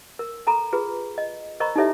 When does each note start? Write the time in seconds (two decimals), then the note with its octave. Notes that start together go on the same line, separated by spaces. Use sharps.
0.19 A#4
0.47 A4 A#5 B5
0.73 F4 G#4 B4
1.18 D#5
1.60 A#4 C5 D#5 A#5 B5 C#6
1.76 D#4 E4 G4 A4 C#5 E5